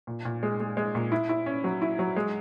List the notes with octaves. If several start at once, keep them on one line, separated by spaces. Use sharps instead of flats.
A#2
A#2
G#3
G#3
G#3
A#2
E4
E4
C#4
F#3
E4
F#3
G#3